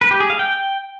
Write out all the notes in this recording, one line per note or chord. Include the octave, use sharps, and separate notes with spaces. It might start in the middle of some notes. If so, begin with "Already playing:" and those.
B4
G4
G#4
F5
G5